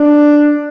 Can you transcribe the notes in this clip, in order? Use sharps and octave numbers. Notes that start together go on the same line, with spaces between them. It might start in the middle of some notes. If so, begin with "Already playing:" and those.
Already playing: D4